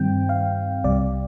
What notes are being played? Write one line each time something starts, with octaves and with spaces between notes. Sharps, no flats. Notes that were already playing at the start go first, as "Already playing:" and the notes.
Already playing: G2 D#3 G3 C4 G5
F5
C2 C3 G3 D5